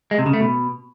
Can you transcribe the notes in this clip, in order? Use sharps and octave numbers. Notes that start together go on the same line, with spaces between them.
G#3
C3
C#3
A3
B2